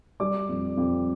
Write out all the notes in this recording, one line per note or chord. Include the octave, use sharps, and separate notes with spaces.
G3 D5 D6
F2
F2